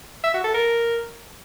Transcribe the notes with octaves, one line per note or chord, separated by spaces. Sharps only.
E5
F#4
A4
A#4